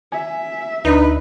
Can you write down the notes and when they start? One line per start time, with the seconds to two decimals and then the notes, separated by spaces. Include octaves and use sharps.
0.12 E5 G#5
0.85 D2 D4 D#4 B4 B5